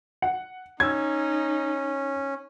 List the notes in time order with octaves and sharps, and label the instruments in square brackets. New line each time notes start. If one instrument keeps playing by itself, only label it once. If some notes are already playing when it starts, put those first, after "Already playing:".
[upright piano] F#5
[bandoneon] C#4 [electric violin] D#4 [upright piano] E6 G#6